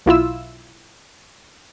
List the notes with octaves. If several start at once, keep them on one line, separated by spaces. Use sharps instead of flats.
B1 E4 F4 E6